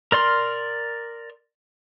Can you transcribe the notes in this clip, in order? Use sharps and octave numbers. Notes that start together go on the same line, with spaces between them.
A#4 D5 C6 F6